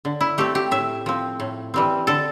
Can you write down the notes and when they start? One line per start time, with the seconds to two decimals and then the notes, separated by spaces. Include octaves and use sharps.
0.05 D3
0.21 E4
0.38 A3 C4 G4
0.55 G4
0.71 A2 E5
1.06 F3 C4
1.40 A2
1.74 E3 G3 C4
2.07 D3 A4